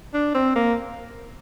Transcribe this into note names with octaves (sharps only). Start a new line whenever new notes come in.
D4
C4
A#3